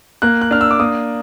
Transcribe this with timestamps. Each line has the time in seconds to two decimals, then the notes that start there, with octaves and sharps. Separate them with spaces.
0.22 A#3 F#6
0.41 F#6
0.51 D4 F6
0.61 E6
0.71 D6
0.80 A#3 D#6